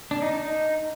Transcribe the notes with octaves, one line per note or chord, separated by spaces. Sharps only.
D4
D#4
D#4